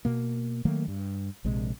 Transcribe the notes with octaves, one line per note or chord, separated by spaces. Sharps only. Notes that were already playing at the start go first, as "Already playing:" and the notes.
B2 A#3
D#3 F#3 A3 A#3
G2
A#1 C3 G#3